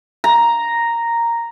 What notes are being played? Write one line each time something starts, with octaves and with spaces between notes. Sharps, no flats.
A#5